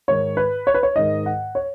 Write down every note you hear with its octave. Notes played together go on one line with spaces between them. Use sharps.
G#2 D#3 C#5
B4
C#5
B4
C#5
G#2 D#3 D#5
F#5
C#5